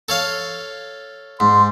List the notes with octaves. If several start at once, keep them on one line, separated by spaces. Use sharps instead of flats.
A4 C#5 F5
G#2 C6